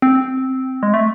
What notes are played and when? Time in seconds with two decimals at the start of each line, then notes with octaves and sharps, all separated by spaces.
0.02 C4
0.83 G#3
0.94 A3